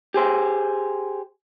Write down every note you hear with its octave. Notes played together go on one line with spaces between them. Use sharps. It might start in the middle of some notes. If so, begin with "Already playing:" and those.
G4 G#4 C5